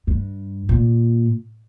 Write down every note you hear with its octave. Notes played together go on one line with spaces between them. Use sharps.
G2
A#2